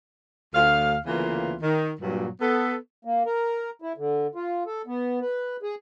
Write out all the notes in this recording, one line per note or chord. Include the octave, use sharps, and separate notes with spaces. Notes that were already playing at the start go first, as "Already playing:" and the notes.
D2 F5
D2 C#3 E3 A#3 B3 F4
D#3
G2 A#2 F#3
B3 A4
A#3
A#4
E4
D3
F4
A4
B3
B4
G#4